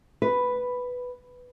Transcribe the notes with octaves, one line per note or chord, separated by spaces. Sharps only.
B4